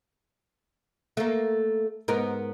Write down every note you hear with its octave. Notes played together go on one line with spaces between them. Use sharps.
A3 A#3
G#2 B3 A#4